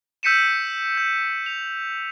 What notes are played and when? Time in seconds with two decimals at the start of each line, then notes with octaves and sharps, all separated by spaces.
0.23 E6 G6 B6 C#7 D#7 E7
0.97 G6
1.46 F7